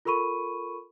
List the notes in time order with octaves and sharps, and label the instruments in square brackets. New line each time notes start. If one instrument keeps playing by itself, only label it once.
[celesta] F4 A4 A#4 B5 C#6 D#7